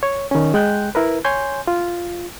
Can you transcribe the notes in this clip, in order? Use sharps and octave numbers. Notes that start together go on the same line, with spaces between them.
C#5
D#3 C#4
G#3 G5 F#6 G6
E4 A#4 B4
C#5 G#5 C6 G6
F4